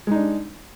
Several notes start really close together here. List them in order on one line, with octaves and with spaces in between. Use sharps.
G#3 D#4 D4